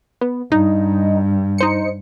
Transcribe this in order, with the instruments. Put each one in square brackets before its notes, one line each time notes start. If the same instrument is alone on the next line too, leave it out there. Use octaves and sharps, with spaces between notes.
[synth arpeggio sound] B3
[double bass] G2 [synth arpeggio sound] D#4
[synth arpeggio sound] D#4 C5 C#7